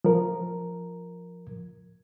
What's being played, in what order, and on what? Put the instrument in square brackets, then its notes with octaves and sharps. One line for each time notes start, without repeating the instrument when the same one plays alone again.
[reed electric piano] F3 A#4